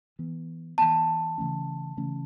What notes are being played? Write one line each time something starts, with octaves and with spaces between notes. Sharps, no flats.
E3 B3
E3 B3 A5
C#3 E3 A3 C#4
C#3 E3 A3 C#4